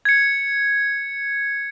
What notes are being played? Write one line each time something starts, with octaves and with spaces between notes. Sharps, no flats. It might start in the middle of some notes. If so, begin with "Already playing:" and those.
G#6 C#7